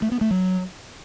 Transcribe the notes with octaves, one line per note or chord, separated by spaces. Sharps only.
A3
B3
A3
F#3